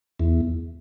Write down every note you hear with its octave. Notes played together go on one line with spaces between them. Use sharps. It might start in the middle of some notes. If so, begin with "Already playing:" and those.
E2